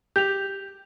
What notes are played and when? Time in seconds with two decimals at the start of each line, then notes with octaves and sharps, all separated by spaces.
0.16 G4 G6 F7